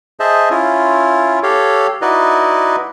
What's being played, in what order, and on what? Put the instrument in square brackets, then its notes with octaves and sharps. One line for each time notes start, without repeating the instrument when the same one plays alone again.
[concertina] G#4 C5 D#5 E5 A5
C#4 E4 F4
G4 A4 C#5 F5
D#4 E4 F#4 B4 D5 D#5